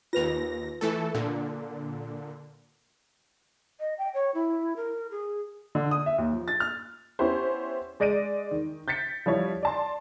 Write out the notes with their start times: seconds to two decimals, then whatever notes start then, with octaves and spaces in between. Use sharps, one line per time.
0.13 D#2 F4 B4 A#6 F7
0.81 E3 A3 A4
1.14 A#2 D3
3.80 D#5
3.98 G5
4.14 C#5
4.34 E4
4.76 A#4
5.11 G#4
5.75 D3
5.91 D#6
6.06 E5
6.18 D#2
6.33 F3
6.48 A6
6.60 F6
7.19 B3 C#4 E4 G4 C5
8.00 G#3 D5 A#6 D7 D#7
8.51 D#3
8.88 G6 A6 B6 C#7
9.26 F3 G3 E4 C#5
9.63 D5 A5 C6